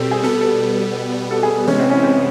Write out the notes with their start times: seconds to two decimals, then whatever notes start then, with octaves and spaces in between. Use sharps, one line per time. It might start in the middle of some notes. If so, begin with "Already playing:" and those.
Already playing: B2 G3 C4 G4 A4
0.11 G#4
0.23 B2 G3 B3 A4
0.41 A4
1.31 A4
1.43 G#4
1.67 C3 E3 G#3 B3 C#4
1.78 C4
1.90 C#4
2.03 C4